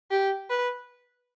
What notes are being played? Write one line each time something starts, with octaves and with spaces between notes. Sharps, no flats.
G4
B4